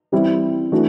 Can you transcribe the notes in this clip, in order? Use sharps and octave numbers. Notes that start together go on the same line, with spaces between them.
E3 G3 C4 E4
E3 A3 D4 F#4